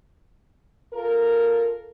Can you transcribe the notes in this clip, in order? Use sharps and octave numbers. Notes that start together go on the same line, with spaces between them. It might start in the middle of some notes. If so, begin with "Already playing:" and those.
F4 A4 A#4